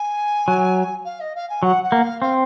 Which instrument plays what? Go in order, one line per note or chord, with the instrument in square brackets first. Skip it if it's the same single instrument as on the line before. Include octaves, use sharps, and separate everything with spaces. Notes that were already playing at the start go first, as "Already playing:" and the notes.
Already playing: [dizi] G#5
[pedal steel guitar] F#3
[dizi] F5
D#5
F5
G#5
[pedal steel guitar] F#3 [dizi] F#5
[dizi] F#5
[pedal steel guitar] A#3
[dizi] F5
[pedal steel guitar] C4 [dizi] F5